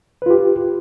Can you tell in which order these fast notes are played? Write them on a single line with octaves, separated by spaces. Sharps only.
B4 F4 G4